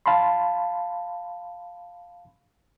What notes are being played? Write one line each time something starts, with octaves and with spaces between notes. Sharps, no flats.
F5 A5 B5 C6